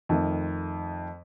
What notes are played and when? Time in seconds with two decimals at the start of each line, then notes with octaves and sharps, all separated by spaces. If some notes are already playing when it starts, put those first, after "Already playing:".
0.09 F2 D#3 A3